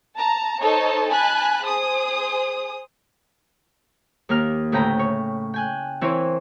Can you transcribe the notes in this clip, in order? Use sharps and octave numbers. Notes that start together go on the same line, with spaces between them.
A5 A#5
D#4 A4 C5 C#5 A5
G#5 A5 B5 F#6
G#4 C5 D#6
D#2 A#3 A#4 F6
D2 A2 C#3 G5 A#5 B5
C#5
G5 G#5 F#6
E3 C4 E4 A#4 C5 C#5